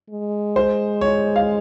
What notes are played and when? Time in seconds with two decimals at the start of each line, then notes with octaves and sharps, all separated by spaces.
0.10 G#3
0.56 C5
1.01 C#5
1.36 F5